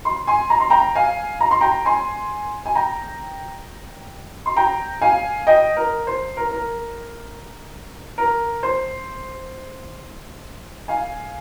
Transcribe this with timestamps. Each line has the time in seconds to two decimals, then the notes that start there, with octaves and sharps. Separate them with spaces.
0.05 C6
0.27 G#5 C6
0.50 A#5
0.60 C6
0.70 G5 A#5
0.95 F5 G#5
1.41 A#5
1.51 C6
1.61 G5 A#5
1.85 G#5 C6
2.66 G#5
2.75 G5 A#5
4.46 C6
4.56 G5 A#5
5.01 F5 G#5
5.47 D#5 G5
5.77 A#4
6.07 C5
6.37 A#4
6.51 A#4
8.18 A#4
8.63 C5
10.88 F5 G#5